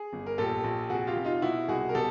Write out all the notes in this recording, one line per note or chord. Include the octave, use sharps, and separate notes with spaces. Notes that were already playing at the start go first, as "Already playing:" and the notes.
Already playing: G#4
G1
A#4
A#1 G4 A4
A#1
F1 F#4 G#4
F4 G4
F1
D#4 F4
B2 E4 F#4
C2 F#4 G#4
A#4
B2 G4 A4